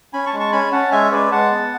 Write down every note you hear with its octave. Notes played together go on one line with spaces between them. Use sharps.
C#4 G#5 B5
A5 C#6
G#3
A5 C#6
C#4 G#5 B5
C#4 F#5 A5
G#3 E5 G#5
G#3 B4 D5
G#3 F#5 A5
B3